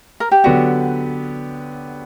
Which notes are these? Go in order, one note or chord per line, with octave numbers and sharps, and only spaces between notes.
A#4
G4
D3 F#3 B3 D4 F#4 G4